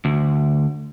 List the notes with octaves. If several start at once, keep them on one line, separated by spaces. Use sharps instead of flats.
D2